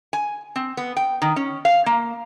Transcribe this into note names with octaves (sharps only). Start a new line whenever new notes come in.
G#5
C4
B3
G5
D#3
C#4
F5
A#3